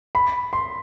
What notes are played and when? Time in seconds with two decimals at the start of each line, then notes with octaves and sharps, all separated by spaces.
0.15 B5
0.53 C6